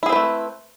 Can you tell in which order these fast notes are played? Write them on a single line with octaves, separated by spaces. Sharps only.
E4 G#4 C4 B4 A3